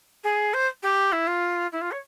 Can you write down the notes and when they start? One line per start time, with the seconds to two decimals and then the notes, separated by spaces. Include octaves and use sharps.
0.24 G#4
0.54 C5
0.83 G4
1.12 E4
1.27 F4
1.72 E4
1.81 F4
1.92 C#5